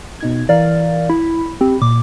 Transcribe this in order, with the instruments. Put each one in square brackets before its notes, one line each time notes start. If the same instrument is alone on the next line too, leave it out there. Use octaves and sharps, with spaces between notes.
[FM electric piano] B2 D#4 G#6
[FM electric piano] E3 A#4 F5 [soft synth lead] D5
[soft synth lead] E4 [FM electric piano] B5
[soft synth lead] C4 [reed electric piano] G4
[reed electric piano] A#2 [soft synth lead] D6